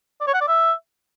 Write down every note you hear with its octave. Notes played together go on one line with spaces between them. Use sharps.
D5
C#5
F#5
D5
E5